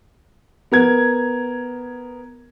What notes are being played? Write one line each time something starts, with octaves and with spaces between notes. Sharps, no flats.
B3 A#4 G#6